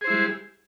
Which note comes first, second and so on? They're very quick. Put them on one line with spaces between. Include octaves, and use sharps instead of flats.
G#4 C5 E4 G#3 G3